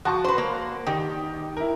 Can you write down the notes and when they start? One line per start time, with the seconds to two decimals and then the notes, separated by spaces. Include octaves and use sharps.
0.05 F3 F#4 A5 C#6
0.24 B4 C5
0.38 A#3
0.87 D#3 G4
1.57 E4 A#4